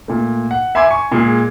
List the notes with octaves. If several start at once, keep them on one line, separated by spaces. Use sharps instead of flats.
A#2 A3
F#5
E5 G#5 B5 C6 D6 G#6
G#5 C#6
A#2 G#3 G#4